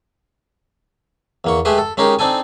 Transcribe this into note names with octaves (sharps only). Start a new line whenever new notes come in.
E2 A#3 C#6
G#3 A3 G4 G#4 B4 E5
A4
G#3 C#4 D#4 G4 G#4 A#4
C4 D4 D#4 A4 G#5